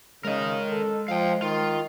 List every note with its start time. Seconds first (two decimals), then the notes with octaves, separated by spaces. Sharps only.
0.25 C#3 G#3 A#4 D#5
0.70 A4
1.08 F3 F5 G5
1.42 D#3 F4